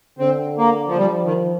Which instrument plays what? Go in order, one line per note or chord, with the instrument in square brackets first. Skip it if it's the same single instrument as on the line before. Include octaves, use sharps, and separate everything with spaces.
[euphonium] D3 [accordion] C4
[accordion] A#3
F3
[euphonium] F3 [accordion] G3
[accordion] D#3